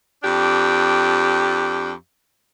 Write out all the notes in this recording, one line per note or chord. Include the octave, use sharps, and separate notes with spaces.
F2 D4 G4